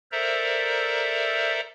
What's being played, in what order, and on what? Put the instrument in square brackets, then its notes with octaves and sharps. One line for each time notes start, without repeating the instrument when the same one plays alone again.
[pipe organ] A4 A#4 C5 D5 E5 A#5